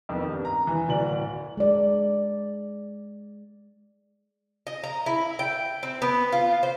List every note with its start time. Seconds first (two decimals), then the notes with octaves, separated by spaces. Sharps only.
0.09 F2 D#3 B3
0.29 G2
0.45 A#5
0.67 E3
0.88 D1 D5 F#7
1.57 G#3 D5
4.67 D#5
4.84 A#5
5.06 E4
5.39 G5
5.83 C4
6.02 B3
6.32 F4
6.63 C5